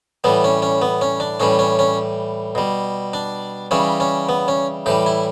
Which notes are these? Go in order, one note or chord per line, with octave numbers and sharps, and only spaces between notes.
A2 E3 G3 B3
C#4
C#4
B3
C#4
D4
A2 E3 G3 C#4
C#4
C#4
B2 G3
D4
C#3 E3 G3 C#4
C#4
B3
C#4
A2 E3 G3 G4
E4